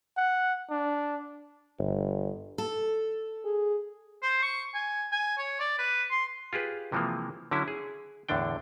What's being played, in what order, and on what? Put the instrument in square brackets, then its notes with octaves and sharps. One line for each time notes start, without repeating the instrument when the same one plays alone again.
[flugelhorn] F#5
D4
[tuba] G1
[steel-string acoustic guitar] A4
[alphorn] G#4
[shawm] C5
C#6
G#5
G#5
C#5
D5
B4
C6
[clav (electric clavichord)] F4 G4 G#4 B4
C3 E3 F3 G#3 A#3
D3 F#3 C#4 E4
G#4
E2 A2 D3 D4 G5